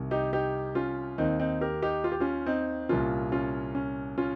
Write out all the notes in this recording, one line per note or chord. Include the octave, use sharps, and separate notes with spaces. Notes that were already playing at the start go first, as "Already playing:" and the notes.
Already playing: C2 C3 D#3
D#4 G4
D#4 G4
C#4 F4
D#2 D#3 C4 D#4
C4 D#4
G4 A#4
D#4 G4
F4
G4
C#4 F4
C4 D#4
C2 A#2 C#4 F4
C#4 F4
C#4
C#4 F4